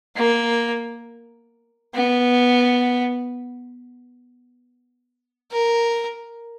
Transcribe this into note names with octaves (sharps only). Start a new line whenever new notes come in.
A#3
B3
A#4